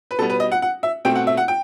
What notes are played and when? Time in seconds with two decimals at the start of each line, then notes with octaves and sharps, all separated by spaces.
0.11 B4
0.19 B2 G3 B3 A4
0.30 B4
0.40 D#5
0.52 F#5
0.62 F#5
0.83 E5
1.05 B2 A3 C4 G5
1.15 F#5
1.27 E5
1.37 F#5
1.48 G5